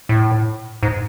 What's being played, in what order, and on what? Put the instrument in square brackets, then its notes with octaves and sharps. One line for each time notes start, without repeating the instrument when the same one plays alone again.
[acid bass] A2
G#2